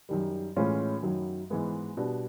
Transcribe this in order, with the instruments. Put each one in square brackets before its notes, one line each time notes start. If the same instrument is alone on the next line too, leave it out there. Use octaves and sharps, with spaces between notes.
[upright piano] F#2 D#3 G3
A2 E3 G#3 C#4 F4
F#2 D#3 F#3
G#2 E3 G#3 B3
B2 G3 B3 D4